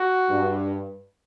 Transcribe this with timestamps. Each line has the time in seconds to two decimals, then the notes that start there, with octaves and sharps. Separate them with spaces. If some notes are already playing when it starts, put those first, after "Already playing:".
Already playing: F#4
0.31 G2